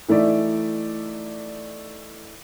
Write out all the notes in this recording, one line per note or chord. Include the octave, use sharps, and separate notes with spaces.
E3 A3 D#4 D5 E5